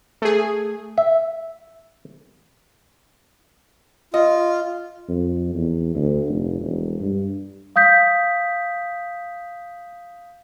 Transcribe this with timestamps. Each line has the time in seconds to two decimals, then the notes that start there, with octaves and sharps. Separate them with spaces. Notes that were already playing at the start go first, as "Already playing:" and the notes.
0.22 A3 G#4
0.98 E5
4.14 F4 D#5
5.09 F2
5.54 E2
5.95 D2
6.28 F1
6.60 E1
7.01 G2
7.76 F5 D#6 G6 B6